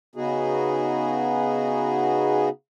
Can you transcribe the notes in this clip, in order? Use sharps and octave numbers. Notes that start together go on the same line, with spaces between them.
C#3 B3 D#4 F#4 G#4